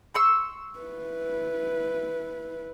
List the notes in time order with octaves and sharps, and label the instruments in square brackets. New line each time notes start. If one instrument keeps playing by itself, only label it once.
[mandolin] C6 C#6 E6
[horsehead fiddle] E4 B4